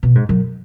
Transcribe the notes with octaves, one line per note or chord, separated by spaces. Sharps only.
B2
G#2
F#2